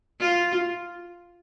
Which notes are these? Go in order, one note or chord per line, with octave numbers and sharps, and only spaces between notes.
F4